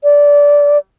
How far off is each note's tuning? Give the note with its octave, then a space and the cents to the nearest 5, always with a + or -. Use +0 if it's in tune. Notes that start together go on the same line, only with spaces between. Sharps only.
D5 -15